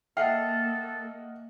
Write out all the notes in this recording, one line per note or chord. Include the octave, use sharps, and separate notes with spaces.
A#3 A4 D#5 E5 F#5 G5 F6 C7